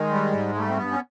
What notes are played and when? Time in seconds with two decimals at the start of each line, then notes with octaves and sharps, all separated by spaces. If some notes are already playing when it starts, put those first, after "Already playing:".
Already playing: D#3 G#3
0.11 G3
0.33 G#2
0.55 G3 A3
0.68 C4
0.77 G2 B3
0.91 C#4